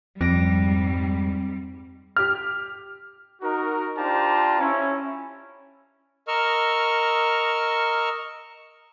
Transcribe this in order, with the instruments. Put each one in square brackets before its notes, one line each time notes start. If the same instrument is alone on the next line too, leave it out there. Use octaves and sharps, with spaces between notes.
[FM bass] F2 [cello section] G#2 G3 [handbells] C4 A#6 D7
[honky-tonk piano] G4 F6
[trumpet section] D#4 F#4 A#4
D4 F4 G4 C5 A5 A#5
C#4 E4
[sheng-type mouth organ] A#4 D#5 C#6 E6 F6